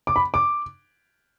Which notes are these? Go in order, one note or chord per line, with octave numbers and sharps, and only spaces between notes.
D6
B5
D6